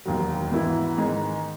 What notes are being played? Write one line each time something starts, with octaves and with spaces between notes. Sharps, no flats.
E1 D#2 D#3 F#3
G#2 E3 B3 E4
G#2 D#3 G#3 D#4 G#4